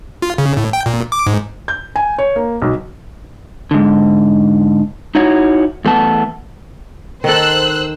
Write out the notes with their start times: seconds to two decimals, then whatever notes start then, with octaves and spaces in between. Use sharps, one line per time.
0.22 F4
0.38 C#3
0.57 A2
0.73 G5
0.86 A#2
1.12 D6
1.27 G#2
1.68 G6
1.96 G#5
2.18 C#5
2.36 A#3
2.62 B1
3.71 G#2 D3
5.15 D#4 E4 F#4 C#5
5.85 E2 A3 B3 A5
7.24 D#3 A4 C5 E6 F#6